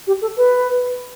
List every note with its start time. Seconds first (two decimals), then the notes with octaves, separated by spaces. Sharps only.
0.07 G4
0.22 A4
0.37 B4